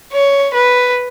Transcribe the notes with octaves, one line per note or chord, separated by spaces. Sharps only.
C#5
B4